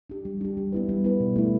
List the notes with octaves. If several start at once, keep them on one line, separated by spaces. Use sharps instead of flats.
D4 G4
G3
D4 G4
G3
B3 E4 B4
G3
B3 E4 B4
B2
A3 E4